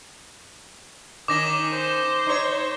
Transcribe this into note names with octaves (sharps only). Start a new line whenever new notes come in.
D#3 C#4 D#4 D6 A#6 E7
C5
D#4 C#5